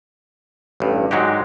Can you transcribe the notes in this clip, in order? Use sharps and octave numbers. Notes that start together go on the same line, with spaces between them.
A1 G2
G#2 F#3 G#3 F#4 G4